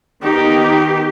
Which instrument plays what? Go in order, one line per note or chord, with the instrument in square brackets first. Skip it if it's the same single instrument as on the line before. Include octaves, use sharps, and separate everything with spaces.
[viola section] D#3 B3 D#4 [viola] G4